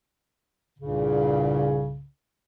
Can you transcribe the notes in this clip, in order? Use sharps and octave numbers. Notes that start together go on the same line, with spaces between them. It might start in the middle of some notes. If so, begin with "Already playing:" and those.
C2 G2 A#2 C#3